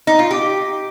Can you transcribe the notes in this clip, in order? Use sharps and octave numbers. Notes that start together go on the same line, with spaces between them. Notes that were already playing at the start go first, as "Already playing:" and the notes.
D#4
F4
G4